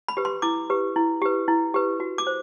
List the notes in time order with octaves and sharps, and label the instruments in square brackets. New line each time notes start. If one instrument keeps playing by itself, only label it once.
[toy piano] B5
G4 B4
C6
E4 D6
G4 B4
E4
G4 B4
E4
G4 B4
F#4
D6
C5